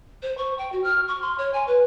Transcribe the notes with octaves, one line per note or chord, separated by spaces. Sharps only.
C5
C#6
G5
F#4
F6
C#6
C6
C#5
G#5
B4